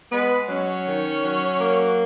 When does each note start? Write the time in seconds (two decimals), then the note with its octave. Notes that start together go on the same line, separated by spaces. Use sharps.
0.12 G#3 B3 B4
0.49 F#3 C#4 C#5
0.87 D#3
1.24 F#3
1.61 A#3